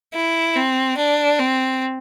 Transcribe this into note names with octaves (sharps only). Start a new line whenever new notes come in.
E4
C4
D4
C4